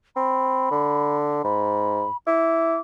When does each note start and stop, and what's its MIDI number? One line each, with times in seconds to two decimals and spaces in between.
0.16 0.66 60
0.16 1.17 83
0.71 1.41 50
1.44 2.05 44
1.44 2.17 83
2.27 2.77 64
2.27 2.80 86